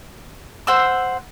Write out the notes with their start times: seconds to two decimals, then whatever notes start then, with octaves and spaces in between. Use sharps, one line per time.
0.67 C5 F#5 E6